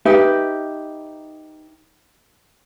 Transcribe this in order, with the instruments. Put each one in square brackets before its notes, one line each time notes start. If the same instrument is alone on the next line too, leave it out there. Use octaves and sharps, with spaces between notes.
[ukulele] D#4 G4 B4 E5